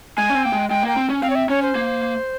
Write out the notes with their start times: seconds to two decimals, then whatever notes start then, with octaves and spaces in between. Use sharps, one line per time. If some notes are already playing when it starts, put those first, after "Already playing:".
0.17 G#3 G#5
0.29 C#4
0.34 C4
0.44 A#3 G5
0.52 G#3
0.70 G#3 G5
0.83 A#3
0.88 G5
0.97 C4
1.10 C#4
1.22 C4 F5
1.30 C#5
1.35 E5
1.49 C#4 C#5
1.62 C5
1.75 A#3